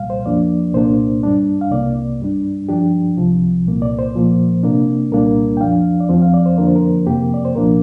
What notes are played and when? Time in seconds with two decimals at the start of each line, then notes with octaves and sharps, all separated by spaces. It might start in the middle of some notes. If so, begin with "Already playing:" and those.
Already playing: C2 A#2 G3 F5
0.10 C5
0.25 F2 F3 A#3 D4 D5
0.74 C2 A#2 A#3 D4 C5
1.23 G2 G3 D4
1.61 F5
1.72 C2 C3 A#3 D5
2.20 G2 G3 D4
2.69 G2 F3 D4 G4
3.17 C2 C3 F3
3.66 C2 A#2 A#3
3.82 D5
3.99 C5
4.15 A#2 F3 A#3
4.63 C3 A#3 D4
5.11 C2 A#2 G3 A#3 D4 A#4
5.57 G5
5.60 F2 F3 D4 F5
6.00 D5
6.09 F2 F3 C4 C5
6.22 F5
6.34 D5
6.46 C5
6.58 F2 D3 F3 A#3 D4 A#4
6.67 C5
6.76 A#4
7.07 F2 C3 A#3 G4
7.34 D5
7.45 C5
7.55 C2 A#2 F3 A#3 D4 A#4